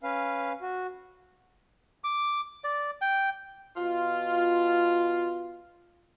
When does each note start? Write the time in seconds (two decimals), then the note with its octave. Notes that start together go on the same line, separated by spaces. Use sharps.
0.03 C#4 B4 F5
0.61 F#4
2.04 D6
2.64 D5
3.01 G5
3.77 B2 F4